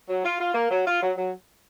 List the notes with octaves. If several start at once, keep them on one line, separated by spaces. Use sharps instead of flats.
F#3
F4
F4
A#3
F#3
F4
F#3
F#3